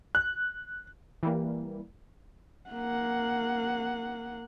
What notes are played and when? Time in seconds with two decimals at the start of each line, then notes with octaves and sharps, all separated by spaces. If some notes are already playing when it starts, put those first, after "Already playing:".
0.15 F#6
1.23 E3 G3 A#3
2.70 A#3 F#5